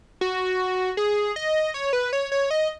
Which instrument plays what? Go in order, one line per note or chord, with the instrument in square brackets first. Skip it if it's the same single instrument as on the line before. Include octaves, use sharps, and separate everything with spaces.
[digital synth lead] F#4
G#4
D#5
C#5
B4
C#5
C#5
D#5